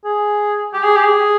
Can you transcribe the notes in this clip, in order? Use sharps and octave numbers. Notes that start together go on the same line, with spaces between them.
G#4
G4
G#4
G4
G#4